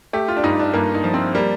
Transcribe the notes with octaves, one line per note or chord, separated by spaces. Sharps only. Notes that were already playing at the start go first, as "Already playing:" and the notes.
A3 G4
F4
D4
G2 D#4
D4
G2 A#3
D#4
F3
C4
G3 A#3